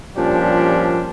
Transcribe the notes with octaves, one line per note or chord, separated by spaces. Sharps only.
A#2 F3 G3 C#4 D4 G4